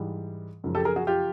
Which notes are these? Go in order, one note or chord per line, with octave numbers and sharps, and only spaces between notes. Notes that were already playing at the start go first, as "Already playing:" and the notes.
Already playing: G#2 E3 G3
F#2 C#3 F3
G4 A4
G#4 A#4
F#4 G#4
F4 G4